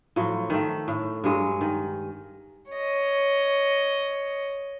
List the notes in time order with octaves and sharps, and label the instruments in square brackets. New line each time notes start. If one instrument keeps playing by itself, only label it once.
[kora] A2 F3 F#3
D#3 A3
A2
G2 F#3 G#3
D#3
[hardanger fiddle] C#5 D#5